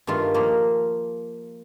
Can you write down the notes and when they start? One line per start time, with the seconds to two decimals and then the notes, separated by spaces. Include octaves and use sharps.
0.07 G2 D#3 A3 F4
0.34 F3 A#3